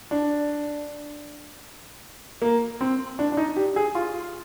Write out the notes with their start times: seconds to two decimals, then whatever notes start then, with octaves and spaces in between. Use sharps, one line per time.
0.11 D4
2.42 A#3
2.81 C4
3.19 D4
3.32 D4
3.37 D#4
3.56 G4
3.76 G#4
3.95 F4